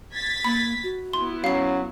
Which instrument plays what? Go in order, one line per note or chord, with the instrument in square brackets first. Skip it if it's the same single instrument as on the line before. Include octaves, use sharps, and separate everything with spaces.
[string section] G#6 A6 B6
[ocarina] A#3 [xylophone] B5
[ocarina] F#4
[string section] B3 E4 [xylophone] C6
[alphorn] F#3 [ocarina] C#4 [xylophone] F5 C7